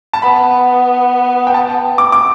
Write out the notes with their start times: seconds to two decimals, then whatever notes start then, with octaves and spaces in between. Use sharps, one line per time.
0.13 A5
0.22 B3 B5
1.47 G5
1.54 A5
1.98 D6
2.12 D6